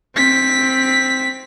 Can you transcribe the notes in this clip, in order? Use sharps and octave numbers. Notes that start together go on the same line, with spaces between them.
C4 B6